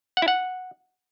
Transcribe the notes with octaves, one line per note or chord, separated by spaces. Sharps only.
F#5
E4
F#5